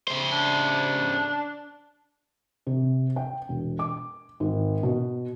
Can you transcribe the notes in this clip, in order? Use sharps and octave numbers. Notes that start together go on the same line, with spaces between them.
C#3 C5
D4
C3
G5
E1
D6
G#1
B2